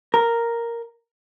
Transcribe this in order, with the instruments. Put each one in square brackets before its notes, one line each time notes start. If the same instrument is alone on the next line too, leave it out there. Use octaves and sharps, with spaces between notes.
[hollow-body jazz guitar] A#4